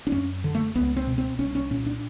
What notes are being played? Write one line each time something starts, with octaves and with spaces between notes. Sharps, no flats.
D4
F#2 C#4
D3
A3
C#2 B3
C4
B2
C4
C2 C#4
C#4
A#2 C#4
D4